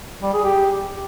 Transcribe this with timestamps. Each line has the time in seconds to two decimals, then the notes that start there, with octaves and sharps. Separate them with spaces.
0.23 G3
0.34 G#4
0.44 G4